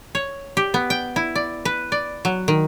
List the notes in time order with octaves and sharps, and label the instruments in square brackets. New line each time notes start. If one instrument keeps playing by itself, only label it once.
[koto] C#5
G4
B3
G5
E4
D5
B4
D5
F#3
D#3